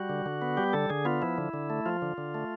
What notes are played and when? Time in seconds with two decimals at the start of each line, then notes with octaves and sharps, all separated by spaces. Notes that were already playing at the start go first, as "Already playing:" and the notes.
Already playing: G3 F#4
0.09 D3
0.26 D3
0.42 B3
0.57 G3 G4
0.73 D3 A4
0.90 D3 G#4
1.05 B3 F4
1.22 F3 E4
1.38 D3
1.54 D3
1.70 A3
1.86 F3 F4
2.02 D3
2.18 D3
2.35 A3